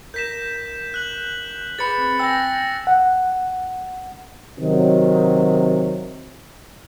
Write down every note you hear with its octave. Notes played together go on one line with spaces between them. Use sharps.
A#4 G6 A#6 B6 E7
F#6 F#7
G#4 B4 B5 A6 C#7
C4
G5 G#5 E6 A#6
F#5
C3 D#3 F#3